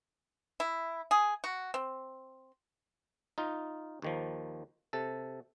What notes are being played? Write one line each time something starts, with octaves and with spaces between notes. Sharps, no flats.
E4
G#4
F#4
C4
D#4 F4
D#2 D#3 F3
C3 A4